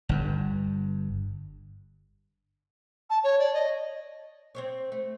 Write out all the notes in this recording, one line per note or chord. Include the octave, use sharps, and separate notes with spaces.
G1 G2
A5
C#5
D5
D#5
C4 C5 C#5
A3